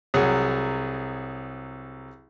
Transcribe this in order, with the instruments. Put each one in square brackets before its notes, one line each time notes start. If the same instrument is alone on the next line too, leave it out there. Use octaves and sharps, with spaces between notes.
[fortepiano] C2 F#3 G#4 F#5